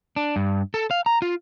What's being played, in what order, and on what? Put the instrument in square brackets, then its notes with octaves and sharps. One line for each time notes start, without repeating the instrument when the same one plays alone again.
[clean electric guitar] D4
G2
A4
F5
A#5
F4